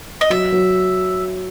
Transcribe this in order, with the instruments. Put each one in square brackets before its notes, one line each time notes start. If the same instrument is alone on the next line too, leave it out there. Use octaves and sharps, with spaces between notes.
[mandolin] D#5
[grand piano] F#3 [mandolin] E5
[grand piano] F#3